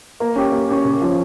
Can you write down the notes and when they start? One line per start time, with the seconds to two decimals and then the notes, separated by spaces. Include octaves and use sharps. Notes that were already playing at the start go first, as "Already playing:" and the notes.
0.20 A#3
0.36 C#4 G4
0.52 A#3
0.69 C#4 G4
0.85 C#3
1.02 F3 C#4